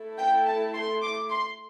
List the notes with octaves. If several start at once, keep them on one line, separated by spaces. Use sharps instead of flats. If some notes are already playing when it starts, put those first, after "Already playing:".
Already playing: A3 E4 A4
G5
A5
C6
D6
C6